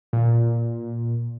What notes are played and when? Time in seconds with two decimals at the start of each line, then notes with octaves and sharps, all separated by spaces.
0.13 A#2